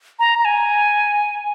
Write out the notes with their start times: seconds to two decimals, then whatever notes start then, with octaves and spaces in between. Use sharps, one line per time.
0.19 A#5
0.38 A#5
0.45 G#5